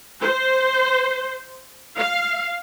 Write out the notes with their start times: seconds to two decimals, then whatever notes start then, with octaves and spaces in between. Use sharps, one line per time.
0.22 C5
1.98 F5